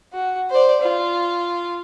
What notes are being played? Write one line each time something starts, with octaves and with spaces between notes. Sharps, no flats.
F#4
C5 D5
F4